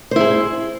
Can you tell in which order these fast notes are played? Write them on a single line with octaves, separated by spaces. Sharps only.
C5 E4 G#4